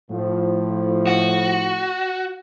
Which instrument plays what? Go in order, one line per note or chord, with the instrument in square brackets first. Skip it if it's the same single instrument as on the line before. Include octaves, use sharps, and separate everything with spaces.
[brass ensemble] A2 F3
[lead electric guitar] F#4